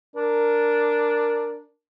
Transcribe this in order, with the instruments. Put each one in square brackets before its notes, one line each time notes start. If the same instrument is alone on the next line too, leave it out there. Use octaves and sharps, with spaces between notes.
[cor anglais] D4 [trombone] A#4